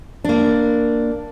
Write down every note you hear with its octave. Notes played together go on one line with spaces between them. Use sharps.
A#3 D4